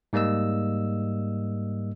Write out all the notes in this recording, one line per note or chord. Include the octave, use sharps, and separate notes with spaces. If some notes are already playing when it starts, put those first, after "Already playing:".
G#2 G3 A#3 D#5 E6